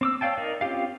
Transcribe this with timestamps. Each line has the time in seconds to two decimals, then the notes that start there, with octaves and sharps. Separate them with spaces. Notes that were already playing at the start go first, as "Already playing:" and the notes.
0.01 C4 D6 E6
0.21 C#5 D5 F5 G5 A5
0.38 D#4 A#4 D5
0.61 C4 C#4 F4 G4 F5